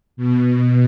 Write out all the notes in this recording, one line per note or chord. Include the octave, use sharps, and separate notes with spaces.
B2